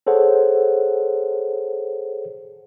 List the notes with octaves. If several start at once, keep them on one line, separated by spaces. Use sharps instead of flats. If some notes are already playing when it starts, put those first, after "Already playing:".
G#4 A4 C5 C#5 F#5